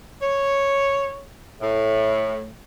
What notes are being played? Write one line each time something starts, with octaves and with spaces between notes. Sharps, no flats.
C#5
A2